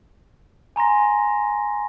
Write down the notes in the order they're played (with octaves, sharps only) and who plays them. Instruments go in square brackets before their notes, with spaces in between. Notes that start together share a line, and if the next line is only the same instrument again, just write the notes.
[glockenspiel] G#5 A#5 C6 A#6